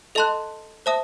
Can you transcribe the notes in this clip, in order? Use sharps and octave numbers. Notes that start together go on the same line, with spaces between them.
A4 D#5 A5 C6 F#6
C5 E5 A5 D#6